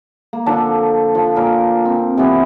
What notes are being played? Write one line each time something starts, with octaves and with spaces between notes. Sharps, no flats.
A#3
D3 F3 D4 A4
F3
A#2 A#4
C4
C3 E3 B3